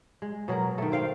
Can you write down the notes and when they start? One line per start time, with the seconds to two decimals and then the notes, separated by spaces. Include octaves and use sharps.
0.22 G#3
0.48 B2 F#3 G#3 A#4
0.78 D#3 A3
0.92 C5 F5 G5